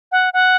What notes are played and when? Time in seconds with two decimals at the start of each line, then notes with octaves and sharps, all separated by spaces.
0.12 F#5
0.34 F#5